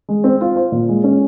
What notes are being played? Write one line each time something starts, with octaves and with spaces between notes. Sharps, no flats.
G#3
C4
F4
C5
A#2
G#3
C#4